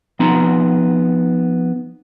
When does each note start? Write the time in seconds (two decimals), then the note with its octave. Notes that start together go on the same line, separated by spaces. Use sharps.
0.20 F3 B3 C4 D#4 A#5 C6